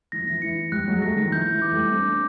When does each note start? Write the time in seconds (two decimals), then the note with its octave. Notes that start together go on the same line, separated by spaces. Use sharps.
0.12 E3 A#6
0.20 F3
0.27 E3
0.42 E3 C#7
0.72 F3 G3 F#6
0.88 F#3 G#3
1.02 G3 A3 A#6
1.17 D#3
1.25 F3
1.32 E3 G6
1.52 E3
1.62 D6
1.72 G3 A3
1.92 C4 D4 D6
2.07 C4 D4